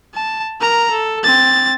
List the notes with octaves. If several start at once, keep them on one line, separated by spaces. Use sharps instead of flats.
A5
A#4 A#5
A4
C4 A6